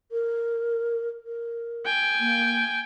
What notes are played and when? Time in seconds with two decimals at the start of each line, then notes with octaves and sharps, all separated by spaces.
0.12 A#4
1.25 A#4
1.85 G5 G#5
2.20 A#3